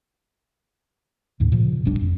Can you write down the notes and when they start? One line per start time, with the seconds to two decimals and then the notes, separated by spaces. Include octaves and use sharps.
1.40 D2 G#2 D3
1.52 A#2 C#3 F3
1.85 F1 B1 G3 D4
2.01 F2